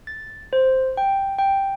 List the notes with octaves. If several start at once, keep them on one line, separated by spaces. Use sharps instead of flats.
A6
C5
G5
G5